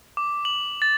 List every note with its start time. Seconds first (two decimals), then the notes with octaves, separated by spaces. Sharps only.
0.17 D6
0.45 F#7
0.82 A6